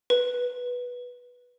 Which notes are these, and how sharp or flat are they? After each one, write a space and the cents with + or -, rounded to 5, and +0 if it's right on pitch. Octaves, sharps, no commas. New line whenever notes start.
B4 -10